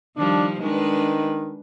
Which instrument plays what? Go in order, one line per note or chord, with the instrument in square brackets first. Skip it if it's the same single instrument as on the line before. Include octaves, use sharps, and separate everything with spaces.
[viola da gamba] D#3 F3 G3 [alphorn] D4
[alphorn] D#3 [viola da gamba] G#3 D4 B4